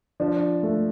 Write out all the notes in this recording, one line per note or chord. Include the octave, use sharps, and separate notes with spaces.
F3 D4
A3